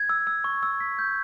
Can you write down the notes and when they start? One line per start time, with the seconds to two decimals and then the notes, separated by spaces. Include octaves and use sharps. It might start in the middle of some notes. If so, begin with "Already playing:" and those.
Already playing: G#6
0.09 E6
0.27 E6
0.44 C#6
0.63 E6
0.80 B6
0.99 G6